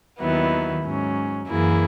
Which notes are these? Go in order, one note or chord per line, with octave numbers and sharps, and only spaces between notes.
D#2 D#3 F#3 B3 E4
G#2 F#3 C#4
F#2 E3 A#3 E4 G#4